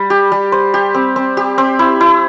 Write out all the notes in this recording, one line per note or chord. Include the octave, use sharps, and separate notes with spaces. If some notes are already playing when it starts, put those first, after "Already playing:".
Already playing: G3
G4
G3
C5
G4
C4
C4
G4
C4
E4
E4